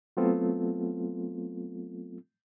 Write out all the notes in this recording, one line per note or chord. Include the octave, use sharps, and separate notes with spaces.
F#3 A3 B3 C4 F4 A4